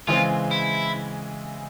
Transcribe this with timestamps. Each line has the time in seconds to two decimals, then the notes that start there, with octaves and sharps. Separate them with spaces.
0.07 C#3 E3 G#3 C4 F4
0.51 E4